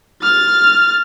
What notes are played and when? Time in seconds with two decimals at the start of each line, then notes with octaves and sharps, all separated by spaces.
0.23 F6 A6